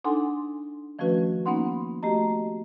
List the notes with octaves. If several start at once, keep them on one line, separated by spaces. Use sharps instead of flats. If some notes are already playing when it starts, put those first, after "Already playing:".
D4 D#4 A4 F#5 G#5 C6
D#3 F3 A3 C#4 F#4 B4
A#3 B3 C#4 D#4 F#5 C6
A3 F#4 G4 D#5 A#5